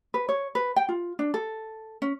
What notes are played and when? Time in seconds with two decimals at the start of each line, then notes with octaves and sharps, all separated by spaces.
0.14 B4
0.29 C#5
0.55 B4
0.76 G5
0.89 F4
1.19 D4
1.34 A4
2.02 C#4